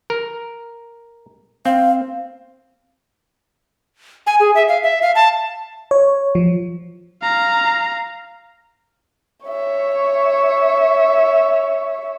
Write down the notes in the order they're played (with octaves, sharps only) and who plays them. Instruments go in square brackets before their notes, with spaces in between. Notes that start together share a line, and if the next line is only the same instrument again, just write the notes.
[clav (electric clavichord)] A#4
[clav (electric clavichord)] C4 [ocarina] F5
[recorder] G#5
G#4
E5
F5
E5
F5
A5
[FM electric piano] C#5
F3
[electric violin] F5 A#5
[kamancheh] C#5 E5